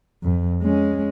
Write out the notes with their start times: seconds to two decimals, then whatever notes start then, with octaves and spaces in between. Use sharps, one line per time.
0.23 F2
0.63 G#3 C#4